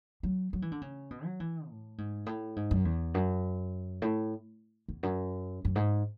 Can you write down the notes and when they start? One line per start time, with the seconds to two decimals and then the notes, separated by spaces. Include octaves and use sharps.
0.23 F#3
0.53 F#3
0.62 E3
0.72 D3
0.81 C#3
1.11 B2
1.25 F#3
1.40 E3
1.69 A2
1.98 G#2
2.26 A2
2.56 G#2
2.71 F#2
2.85 E2
3.14 F#2
4.02 A2
4.88 E2
5.03 F#2
5.65 F#2
5.75 G#2